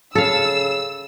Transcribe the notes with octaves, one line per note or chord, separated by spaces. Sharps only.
C#3 A4 F5 E6